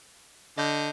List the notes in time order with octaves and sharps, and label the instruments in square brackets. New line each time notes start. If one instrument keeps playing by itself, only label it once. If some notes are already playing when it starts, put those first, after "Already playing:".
[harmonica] D3 [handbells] D#5 G6